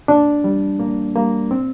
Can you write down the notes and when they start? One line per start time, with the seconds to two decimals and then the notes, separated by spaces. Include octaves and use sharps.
0.08 A#2 D4
0.44 G3
0.79 A#2 A#3
1.16 G3 A#3
1.51 A#2 C4